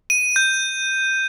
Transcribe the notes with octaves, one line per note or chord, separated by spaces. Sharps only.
D#7
G6